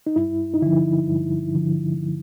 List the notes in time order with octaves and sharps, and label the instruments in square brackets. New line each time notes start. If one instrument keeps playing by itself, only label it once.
[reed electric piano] D#4
G2 E4
D#4
D3 F3 E4
G2
D3 F3